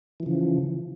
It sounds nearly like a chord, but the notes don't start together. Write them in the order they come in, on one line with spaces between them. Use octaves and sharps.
E3 F3 C#3